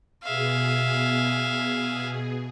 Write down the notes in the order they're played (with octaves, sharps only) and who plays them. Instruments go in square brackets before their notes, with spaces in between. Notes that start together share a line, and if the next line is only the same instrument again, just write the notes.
[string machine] B2 G#4 [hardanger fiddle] E5 F5